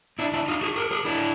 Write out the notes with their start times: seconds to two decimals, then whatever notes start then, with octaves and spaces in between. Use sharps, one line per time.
0.19 D4 E4
0.34 D4 E4
0.48 D#4 F4
0.62 F#4 G#4
0.76 G#4 A#4
0.91 G#4 A#4
1.05 D4 E4